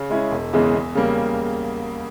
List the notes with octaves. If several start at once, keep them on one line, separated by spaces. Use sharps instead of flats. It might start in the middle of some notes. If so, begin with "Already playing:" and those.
Already playing: C#3
G#3 C#4 E4
E1
E2 C#3 E3 G#3
E2
C#3 G3 A#3